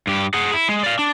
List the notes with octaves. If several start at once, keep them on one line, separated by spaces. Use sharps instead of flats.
G2 G4
G#4 F#5
E4
G#3
D5 F5
D4